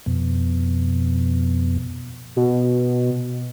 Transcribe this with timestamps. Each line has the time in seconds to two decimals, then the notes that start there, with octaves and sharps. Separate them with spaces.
0.06 F2 B2
2.36 B2